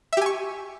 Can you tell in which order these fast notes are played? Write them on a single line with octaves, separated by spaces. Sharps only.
E5 G4 G#5 C#6